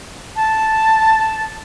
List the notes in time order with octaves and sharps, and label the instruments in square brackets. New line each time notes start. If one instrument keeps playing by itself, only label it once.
[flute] A5